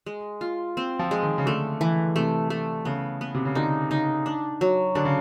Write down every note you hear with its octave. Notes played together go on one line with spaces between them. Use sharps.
G#3
F4
C4
F3
G#3
D#3
C#3
D3 A3
E3
C3 A3
A3
C#3 B3
B3
C3
C#3
D3 D#4
C#3 D#4
D4
F#3
D3 D4
C#3